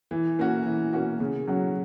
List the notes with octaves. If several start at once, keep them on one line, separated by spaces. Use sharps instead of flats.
E3
A#3 C#4 F#4
E3
A#3 C#4 F#4
C#3
F#3 C#4 F#4